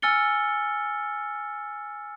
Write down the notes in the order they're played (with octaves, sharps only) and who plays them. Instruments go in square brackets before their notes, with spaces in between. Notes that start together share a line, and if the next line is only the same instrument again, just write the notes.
[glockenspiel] G#5 E6 F6 A6 C#7 G7